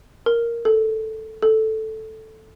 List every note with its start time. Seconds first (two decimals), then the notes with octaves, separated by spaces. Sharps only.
0.26 A#4
0.65 A4
1.42 A4